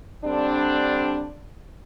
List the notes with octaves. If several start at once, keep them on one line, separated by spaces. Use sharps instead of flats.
D3 G3 C4 D4